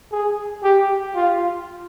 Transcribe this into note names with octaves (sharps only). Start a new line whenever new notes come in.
G#4
G4
F4